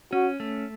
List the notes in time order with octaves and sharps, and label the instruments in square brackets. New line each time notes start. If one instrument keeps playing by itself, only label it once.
[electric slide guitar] C#4 [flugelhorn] F#4
[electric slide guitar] A3